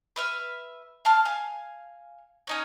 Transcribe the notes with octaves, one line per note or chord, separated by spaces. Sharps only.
B4 E5 F6
F5 A5 F6
F5 G#5
C#4 D#4 C#5